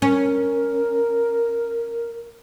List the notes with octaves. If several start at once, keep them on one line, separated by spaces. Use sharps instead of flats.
C#4 A#4